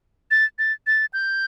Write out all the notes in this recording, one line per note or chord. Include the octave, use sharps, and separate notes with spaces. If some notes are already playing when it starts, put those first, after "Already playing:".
A6
A6
A6
G6